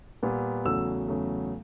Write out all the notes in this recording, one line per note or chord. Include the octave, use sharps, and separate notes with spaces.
A#2 G3 B3
E2 C#3 F#3 A3 E6
E2 C#3 F#3 A3